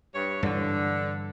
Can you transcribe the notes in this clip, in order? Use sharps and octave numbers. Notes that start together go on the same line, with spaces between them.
G2 C#5
G2 D3 E3